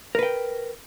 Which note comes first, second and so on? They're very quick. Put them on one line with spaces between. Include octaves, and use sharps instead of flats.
A#4 B4 G5